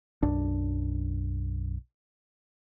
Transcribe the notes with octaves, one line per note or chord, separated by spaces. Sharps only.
B1 F#2 D4